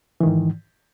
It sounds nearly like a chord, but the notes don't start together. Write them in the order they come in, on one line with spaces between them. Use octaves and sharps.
E3 D#3 G#2